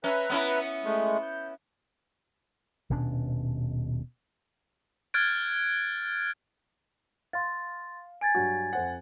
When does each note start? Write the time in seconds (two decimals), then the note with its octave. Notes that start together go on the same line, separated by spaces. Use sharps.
0.04 C#4 B4 E5 A#5
0.30 B3 C#4 E4
0.84 G#3 A3
1.23 G6
2.90 D#1 B2 C#4 D4
5.14 F6 F#6 G#6 A6 D7
7.33 F5 C6 A6
8.21 G#5 G#6 A6 D7
8.35 G2 F#3 F#4
8.73 F2 C5 F#5